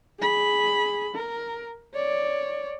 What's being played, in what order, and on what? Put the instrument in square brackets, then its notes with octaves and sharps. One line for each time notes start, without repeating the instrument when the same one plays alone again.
[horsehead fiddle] G#4 B5
A#4
C#5 D5